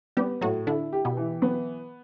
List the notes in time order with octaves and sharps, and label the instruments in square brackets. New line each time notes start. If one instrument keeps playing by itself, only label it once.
[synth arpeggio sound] G3 G4 [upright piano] B3
[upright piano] A2 [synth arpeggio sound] F#3 F#4
[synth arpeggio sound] D3 D4 [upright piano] E4
[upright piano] G4
[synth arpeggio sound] B2 B3
[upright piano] E3
[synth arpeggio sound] F#3 [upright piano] B3